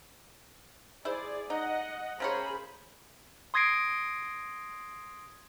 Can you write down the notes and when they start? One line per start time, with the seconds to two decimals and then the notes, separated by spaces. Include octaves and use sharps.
1.05 E4 G#4 C5 D5
1.50 D#4 D#5 F#5
2.20 C#3 G#4 A#4 C5 C#5 B5
3.54 C6 D#6 G#6 A#6 C7 D7